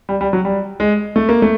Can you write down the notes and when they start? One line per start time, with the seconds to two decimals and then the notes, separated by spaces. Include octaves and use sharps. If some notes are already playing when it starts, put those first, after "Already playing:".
0.09 G3
0.21 G3
0.33 F#3
0.45 G3
0.80 G#3
1.16 A3
1.29 A#3
1.42 A3